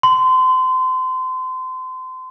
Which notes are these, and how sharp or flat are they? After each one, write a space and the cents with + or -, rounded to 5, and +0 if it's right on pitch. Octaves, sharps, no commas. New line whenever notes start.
C6 -30